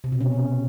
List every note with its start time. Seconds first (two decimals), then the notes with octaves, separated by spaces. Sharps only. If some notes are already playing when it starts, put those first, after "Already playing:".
0.04 C3
0.12 B2
0.21 C#4